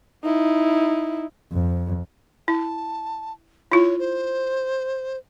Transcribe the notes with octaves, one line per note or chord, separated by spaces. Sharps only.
D#4 E4
F2
E4 A5
E4 F4 C#5
C5